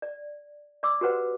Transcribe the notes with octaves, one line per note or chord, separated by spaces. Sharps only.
D5
D5 C6 D6 E6
F#4 G4 B4 C5 F#5